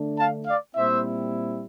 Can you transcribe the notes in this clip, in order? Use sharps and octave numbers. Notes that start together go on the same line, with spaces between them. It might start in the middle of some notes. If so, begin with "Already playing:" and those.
Already playing: D3 A3 D4
F5 A5
D5 F5
A#2 G3 C4 E4 C5 E5